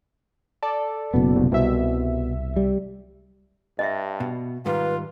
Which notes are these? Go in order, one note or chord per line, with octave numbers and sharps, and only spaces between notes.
A4 D5
F#1 B2 B3
C2
C2 B2 E5
G3
G2 D#5 E5
B2
G#2 D#3 G3 F4 B4